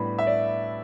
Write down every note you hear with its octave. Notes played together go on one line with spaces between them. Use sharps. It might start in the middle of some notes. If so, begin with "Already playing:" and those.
Already playing: A2 G3 B3 D4 B5
E5
D5